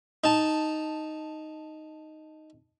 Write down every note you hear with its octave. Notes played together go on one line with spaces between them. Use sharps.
D#4 A5